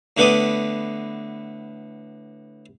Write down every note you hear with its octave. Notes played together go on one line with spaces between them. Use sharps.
A2 D3 B3 B4 D5 D#6